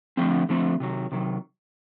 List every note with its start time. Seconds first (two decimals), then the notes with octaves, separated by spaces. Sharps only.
0.17 D3 F3 A3 C4
0.49 D3 F3 A3 C4
0.80 C3 D#3 F#3
1.12 C3 D#3 F#3